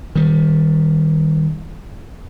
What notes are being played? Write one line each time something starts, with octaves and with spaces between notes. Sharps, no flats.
D#3 G3